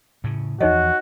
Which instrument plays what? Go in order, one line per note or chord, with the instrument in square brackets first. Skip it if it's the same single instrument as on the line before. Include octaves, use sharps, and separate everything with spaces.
[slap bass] A2 C#3
[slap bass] E2 F3 [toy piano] D#4 C#5 D#5 [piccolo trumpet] F#4